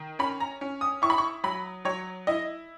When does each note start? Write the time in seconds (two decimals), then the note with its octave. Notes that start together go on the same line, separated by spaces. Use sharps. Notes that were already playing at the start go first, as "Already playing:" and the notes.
Already playing: D#3
0.19 C#4 B5
0.40 A#5
0.61 C#4
0.81 D#6
1.02 E4 C#6
1.10 B5
1.18 C#6
1.44 F#3 B5
1.85 F#3 C#5
2.27 E4 D#5